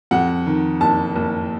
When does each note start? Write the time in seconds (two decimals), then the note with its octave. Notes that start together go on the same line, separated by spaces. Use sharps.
0.11 F2 F#5
0.46 D#3
0.81 F#1 A5
1.16 F#1